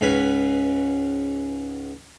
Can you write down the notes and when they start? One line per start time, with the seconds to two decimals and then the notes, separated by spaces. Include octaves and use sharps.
0.01 C#2 G#2 C#4 B4 G#5